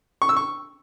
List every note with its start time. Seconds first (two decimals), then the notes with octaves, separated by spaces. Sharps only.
0.22 C#6
0.29 E6
0.37 C#6